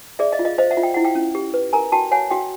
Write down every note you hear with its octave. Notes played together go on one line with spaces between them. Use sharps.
G#4 D5 E5
D#5 F5
F4
D#5 F5
C5 D#5 F5
E5 F#5
F4
G5
E4 F#5
F5 G5
C#4
G4
B4
A#4 G#5 A#5
F#4 G5 A5
C#5 F#5 G#5
F#4 F5 G5